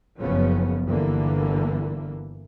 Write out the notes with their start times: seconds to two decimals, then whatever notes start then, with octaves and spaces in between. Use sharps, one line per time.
0.20 F#1 F#2 C#3 F3 B3 C#4
0.88 G1 D3 E3 A#3